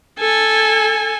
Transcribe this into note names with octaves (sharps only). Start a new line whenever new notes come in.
A4 G#5